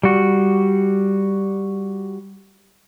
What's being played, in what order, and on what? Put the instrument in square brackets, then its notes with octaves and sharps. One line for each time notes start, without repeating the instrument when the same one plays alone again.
[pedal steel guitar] G3 F#4